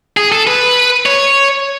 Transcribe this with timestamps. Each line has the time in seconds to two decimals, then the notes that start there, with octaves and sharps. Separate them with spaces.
0.17 G#4
0.32 A4
0.47 B4
1.06 C#5